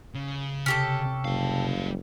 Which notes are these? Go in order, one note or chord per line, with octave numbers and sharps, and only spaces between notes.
C#3
C3 C#4 G4 A4
F#1 G3 F5